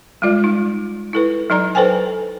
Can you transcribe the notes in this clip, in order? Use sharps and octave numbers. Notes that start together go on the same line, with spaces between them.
G3 G#3 F4 D5
D#4
E4 A4 B4
F#3 D#4 D5 A#5
A4 B4 C5 G5 G#5